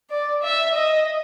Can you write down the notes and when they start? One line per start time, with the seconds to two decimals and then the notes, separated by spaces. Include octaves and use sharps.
0.10 D5
0.43 E5
0.75 D#5